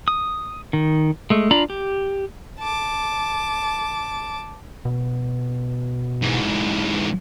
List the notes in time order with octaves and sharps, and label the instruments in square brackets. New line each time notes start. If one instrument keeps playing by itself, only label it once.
[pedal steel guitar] D#6
D#3
G#3 A3
D4 F4 D5 A#5 B5
G4
[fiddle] A5 D6
[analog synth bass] B2
[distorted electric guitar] G#2 E3